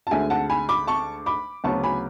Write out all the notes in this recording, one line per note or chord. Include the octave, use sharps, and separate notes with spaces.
A5
D2 D3 G#3 E5 G#5
F#5 A5
G#5 B5
B5 D6
A5 C#6
B5 D6
D2 C#3 F#3 B3 A5 C#6
G#5 B5